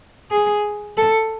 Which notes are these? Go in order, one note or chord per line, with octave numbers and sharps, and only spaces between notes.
G#4
A4